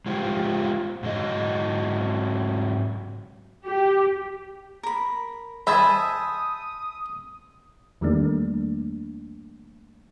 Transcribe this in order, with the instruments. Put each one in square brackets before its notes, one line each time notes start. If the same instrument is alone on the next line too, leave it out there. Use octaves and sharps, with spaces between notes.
[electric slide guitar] G#3 F4 G4 C5
G#2 F#3 D#5
[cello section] G4
[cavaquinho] A#4 B5
[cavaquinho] C5 G#5 A5 [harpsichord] E5 [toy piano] B5 [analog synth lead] D#6
[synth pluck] E2 D#3 G3 A3 A#3 D4